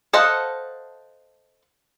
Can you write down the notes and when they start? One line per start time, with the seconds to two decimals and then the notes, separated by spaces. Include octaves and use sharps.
0.13 A4 C5 D#5 F5 F#5